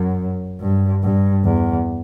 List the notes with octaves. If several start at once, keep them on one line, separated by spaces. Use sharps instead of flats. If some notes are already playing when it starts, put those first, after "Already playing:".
Already playing: F#2
G2
G2
E2